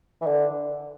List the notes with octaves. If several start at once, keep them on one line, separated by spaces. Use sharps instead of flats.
E3
D3